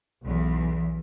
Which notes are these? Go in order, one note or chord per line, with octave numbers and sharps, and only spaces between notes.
B1 E2